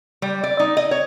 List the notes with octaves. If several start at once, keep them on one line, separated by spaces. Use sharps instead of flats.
G3
D5
D#4
D#5
C#5